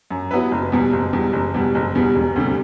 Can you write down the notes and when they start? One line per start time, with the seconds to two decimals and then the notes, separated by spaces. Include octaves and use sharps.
0.11 F#2
0.31 F#3 B3 E4 B4
0.51 F#1
0.72 E2 B2 G3
0.93 F#1
1.13 E2 B2 G3
1.33 F#1
1.54 E2 B2 G3
1.75 F#1
1.95 E2 B2 G3
2.16 E1
2.36 D2 C3 G3